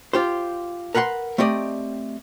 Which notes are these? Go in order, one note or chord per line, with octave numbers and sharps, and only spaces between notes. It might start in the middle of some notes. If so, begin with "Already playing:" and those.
F4 G4 C5
A#4 B4 F#5 G5 C6
A3 C4 G4 D5 D#5